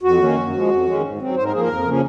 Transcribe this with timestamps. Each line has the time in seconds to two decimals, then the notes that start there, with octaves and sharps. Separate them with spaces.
0.03 F2 F#4
0.20 D#3 A#3 C#4
0.37 F#2
0.53 F3 G#3
0.69 F2
0.86 D#3 G#3 C#4
1.02 G#2
1.19 F#3 C4
1.35 G#2 C5
1.44 A#4
1.52 F3 A#3 G#4
1.61 A#4
1.68 F2
1.85 C#3 F3 A#3 C#4